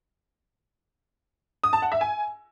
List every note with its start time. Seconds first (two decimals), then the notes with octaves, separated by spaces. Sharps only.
1.64 D#6
1.73 A5
1.82 F#5
1.92 E5
2.01 G#5